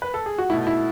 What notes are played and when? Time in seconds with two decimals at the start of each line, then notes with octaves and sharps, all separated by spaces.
0.02 B4
0.14 A4
0.26 G#4
0.38 F#4
0.50 B2 A3 E4
0.67 E4